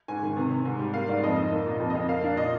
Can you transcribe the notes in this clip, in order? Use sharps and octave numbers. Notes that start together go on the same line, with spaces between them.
G#2 G#5
D#3
C3
C3
G#2
G3
A#3 F5
G#2 D5
F2 D#5
D#4
A#3
A#2
F2
D#5
F2
A#3 F5
D4
A#2 D#5